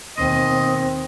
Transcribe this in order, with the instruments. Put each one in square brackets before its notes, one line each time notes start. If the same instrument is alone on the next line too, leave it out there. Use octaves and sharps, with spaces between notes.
[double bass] D#2 B2 [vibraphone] C4 C5 G5 [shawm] D#5